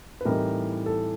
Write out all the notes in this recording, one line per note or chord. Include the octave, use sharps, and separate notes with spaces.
B4
A2 E3 G3 C4 D#4 A#4
A4